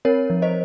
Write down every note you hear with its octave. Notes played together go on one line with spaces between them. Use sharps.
C4 A#4 C#5
F3
C5 D#5